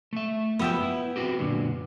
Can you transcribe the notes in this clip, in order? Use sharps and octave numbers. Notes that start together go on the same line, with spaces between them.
A3 E5
F#2 F3 B3 G4 E5 G5
E4
C4 F#4 G4
F#2 A#2 D3